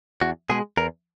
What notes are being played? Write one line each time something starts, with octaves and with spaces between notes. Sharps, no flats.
E2 F#4
B2 G#3 G#4
E2 A#4